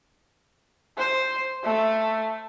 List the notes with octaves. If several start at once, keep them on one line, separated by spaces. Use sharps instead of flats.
C5
A3